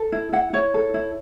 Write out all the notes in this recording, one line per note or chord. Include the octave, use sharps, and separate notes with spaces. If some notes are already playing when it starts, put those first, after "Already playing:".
Already playing: A4
E4
E4 F#5
E4 C#5
A4
E4